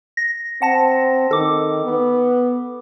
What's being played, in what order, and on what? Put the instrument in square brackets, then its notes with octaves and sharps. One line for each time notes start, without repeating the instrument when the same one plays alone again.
[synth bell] A#6
[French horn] C4 [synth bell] F#5 A5 A#6
[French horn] D#3 [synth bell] A4 D6
[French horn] B3